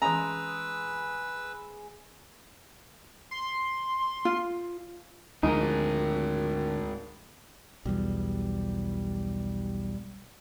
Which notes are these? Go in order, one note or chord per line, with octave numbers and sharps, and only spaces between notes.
E3 G#3 C#4 B4 A#5 D#6 E6
C6
F4
D2 G#2 F3 D#4 G#4 A#4
B1 E2 G3